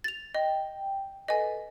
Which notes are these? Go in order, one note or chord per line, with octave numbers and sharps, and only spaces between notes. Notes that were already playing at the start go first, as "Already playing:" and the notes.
A6 F7
D#5 G5
A4 B4 D#5 G#5